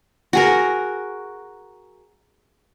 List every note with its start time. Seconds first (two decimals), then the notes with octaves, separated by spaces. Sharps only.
0.33 F#4 G#4 A#4